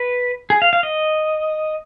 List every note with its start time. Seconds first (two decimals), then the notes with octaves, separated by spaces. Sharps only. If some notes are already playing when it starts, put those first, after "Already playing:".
Already playing: B4
0.50 G#4
0.62 F5
0.73 F5
0.83 D#5